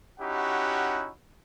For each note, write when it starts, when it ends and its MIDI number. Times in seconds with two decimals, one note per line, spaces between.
0.20 1.10 61
0.20 1.10 63
0.20 1.10 64
0.20 1.10 66
0.20 1.10 67
0.20 1.10 78